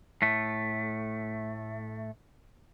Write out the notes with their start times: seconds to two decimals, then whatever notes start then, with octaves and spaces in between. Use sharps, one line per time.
0.22 A2 A3